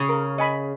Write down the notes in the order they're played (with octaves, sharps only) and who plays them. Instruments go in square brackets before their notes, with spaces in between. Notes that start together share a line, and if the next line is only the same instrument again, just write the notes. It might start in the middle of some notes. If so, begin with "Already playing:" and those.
Already playing: [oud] C#3
[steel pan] A#4
D#5 G#5 B5